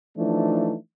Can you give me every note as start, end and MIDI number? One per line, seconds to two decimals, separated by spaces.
0.18 0.75 52
0.18 0.75 53
0.18 0.75 57
0.18 0.75 62
0.18 0.75 63